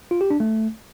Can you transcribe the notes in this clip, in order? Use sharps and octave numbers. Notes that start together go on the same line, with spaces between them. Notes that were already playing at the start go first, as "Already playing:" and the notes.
F4
G4
D4
A3